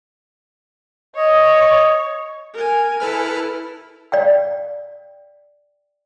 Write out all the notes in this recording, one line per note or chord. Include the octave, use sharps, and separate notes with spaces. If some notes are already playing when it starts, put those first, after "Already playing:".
C#5 D#5
A#4 G#5
E4 A4 B4 F6
D5 F5 G5